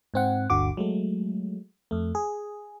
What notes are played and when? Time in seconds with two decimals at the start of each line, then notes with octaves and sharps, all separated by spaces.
0.14 G#2 C4 F#5
0.50 G1 D2 D3 F#4 D6
0.77 F#3 G#3 A3
1.91 F2 A3
2.15 G#4